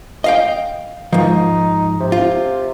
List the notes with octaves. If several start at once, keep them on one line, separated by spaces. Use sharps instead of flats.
D#5 F5 G5
G#2 F3 D#4
C3
F4